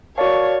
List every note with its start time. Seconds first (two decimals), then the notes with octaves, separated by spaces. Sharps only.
0.17 F#4 A#4 C#5 D5 F5 A5